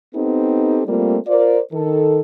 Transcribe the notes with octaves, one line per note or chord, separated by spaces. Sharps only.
B3 C4 D#4 G4 A4
G3 A3 A#3 C4 F4
F4 A#4 C5 D5
D#3 A4